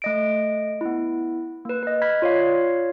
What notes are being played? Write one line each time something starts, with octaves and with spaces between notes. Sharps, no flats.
A3 D#5 D7
B3 E4
A#3 B4
B4 D#5
B5 F6 G#6 B6
F4 C#5 D5 F5